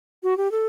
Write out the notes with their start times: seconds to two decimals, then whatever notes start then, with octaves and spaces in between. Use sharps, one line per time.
0.23 F#4
0.37 G4
0.51 A4